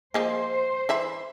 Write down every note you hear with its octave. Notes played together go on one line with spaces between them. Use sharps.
F3 G#3 A#3 C5
E3 E5 B5